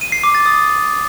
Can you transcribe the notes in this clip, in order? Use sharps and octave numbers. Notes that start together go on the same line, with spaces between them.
D#7
C7
D6
A6
D#6